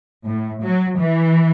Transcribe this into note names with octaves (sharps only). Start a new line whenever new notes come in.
A2
F#3
E3